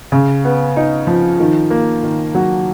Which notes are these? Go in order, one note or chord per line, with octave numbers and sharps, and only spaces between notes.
C#3
B3
D#4
F3
D#3
A#3
D#3
F#3